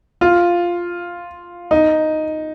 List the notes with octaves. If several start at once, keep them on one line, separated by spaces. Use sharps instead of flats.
F4
D#4